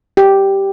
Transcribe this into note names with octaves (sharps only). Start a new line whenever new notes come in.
G4